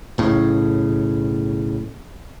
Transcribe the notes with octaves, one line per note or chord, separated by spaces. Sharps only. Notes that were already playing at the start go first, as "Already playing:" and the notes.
B1 A2 C#3